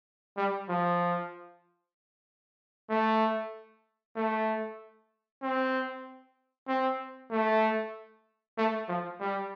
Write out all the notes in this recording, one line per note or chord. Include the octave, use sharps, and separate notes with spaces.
G3
F3
A3
A3
C4
C4
A3
A3
F3
G3